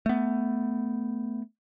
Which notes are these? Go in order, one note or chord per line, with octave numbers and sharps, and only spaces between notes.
A3 B3